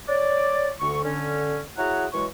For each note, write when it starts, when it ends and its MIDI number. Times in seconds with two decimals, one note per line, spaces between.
0.09 0.72 73
0.09 0.72 74
0.81 1.05 38
0.81 1.05 50
0.81 1.05 85
1.05 1.61 50
1.05 1.61 61
1.78 2.06 64
1.78 2.06 66
1.78 2.06 68
1.78 2.06 73
1.78 2.06 78
1.78 2.06 82
2.13 2.26 52
2.13 2.26 54
2.13 2.26 56
2.13 2.26 73
2.13 2.26 85